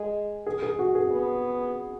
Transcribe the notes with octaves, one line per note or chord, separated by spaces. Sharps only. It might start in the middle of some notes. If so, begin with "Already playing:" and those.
Already playing: G#3
G#4
G#4
F#4
G#4
B3